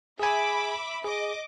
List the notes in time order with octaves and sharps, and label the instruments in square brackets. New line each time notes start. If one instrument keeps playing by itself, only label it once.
[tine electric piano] G#4 G#5 [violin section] E5 B5 D6
[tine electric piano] G#4 [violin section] D#5 D6